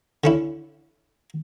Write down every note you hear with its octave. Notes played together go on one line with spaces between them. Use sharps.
D3 C#4 E4